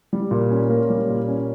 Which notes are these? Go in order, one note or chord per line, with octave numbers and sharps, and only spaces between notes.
G3
A#2
C#4
A#3
G3
A#2
C#4